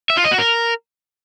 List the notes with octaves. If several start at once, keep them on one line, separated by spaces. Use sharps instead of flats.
E5
F4
D#5
F#4
A#4